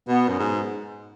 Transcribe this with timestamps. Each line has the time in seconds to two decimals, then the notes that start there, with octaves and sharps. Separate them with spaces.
0.08 B2 B3
0.29 F#2
0.39 G#2